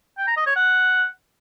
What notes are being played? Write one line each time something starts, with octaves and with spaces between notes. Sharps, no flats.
G5
A#5
D#5
C#5
F#5